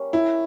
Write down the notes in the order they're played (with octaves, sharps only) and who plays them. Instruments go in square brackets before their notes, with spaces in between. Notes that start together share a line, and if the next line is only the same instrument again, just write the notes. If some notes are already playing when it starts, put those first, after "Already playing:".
Already playing: [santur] G3 A#3 C#4
[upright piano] E4